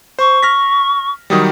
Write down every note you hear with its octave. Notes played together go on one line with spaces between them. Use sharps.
C5 C#6
F6 A#6 B6
D#3 F#3 G3 D#6